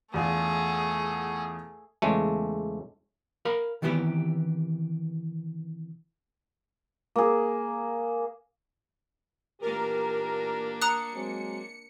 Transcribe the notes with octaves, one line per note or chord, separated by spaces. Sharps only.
E2 A3 D4 F4 G#4
E2 C#3 G#3 A3
A#4 F5 B5
C3 D#3 E3 B3 E4 G4
A#3 G#4
A#2 E3 A#3 D4 G4 A#4
A#5 D#6 F#6 C#7
F#3 G#3 C4